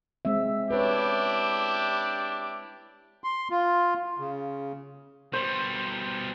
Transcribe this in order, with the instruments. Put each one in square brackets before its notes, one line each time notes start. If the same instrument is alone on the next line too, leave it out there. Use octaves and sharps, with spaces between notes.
[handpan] G#3 C4 E5
[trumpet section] D4 E4 G4 [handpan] B4 C#5
[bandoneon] C6
F4
C#3
[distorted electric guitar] B2 G3 [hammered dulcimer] C5